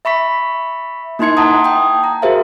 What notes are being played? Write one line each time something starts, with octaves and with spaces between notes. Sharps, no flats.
E5 B5 C#6 B6
A#3 D#4 E4 C6 G#6 C#7
F#5 A5 A#5 D#6
G5 D#6
A#5
F#4 G#4 A#4 C5 E5 F5